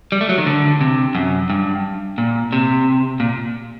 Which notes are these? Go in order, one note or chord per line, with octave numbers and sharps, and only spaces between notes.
G3
A3
F#3
D#3
D3
C3
F#2
G2
A#2
C3
A#2